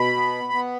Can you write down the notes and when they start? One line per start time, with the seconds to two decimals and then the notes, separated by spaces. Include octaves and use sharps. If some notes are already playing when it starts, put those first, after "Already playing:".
Already playing: B2 B5
0.17 B3
0.53 B3